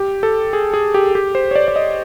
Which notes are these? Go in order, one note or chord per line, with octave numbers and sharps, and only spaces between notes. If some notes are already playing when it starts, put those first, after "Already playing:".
Already playing: G4
A4
G#4
G#4
G4
G4
C5
C#5
D5
D5
D#5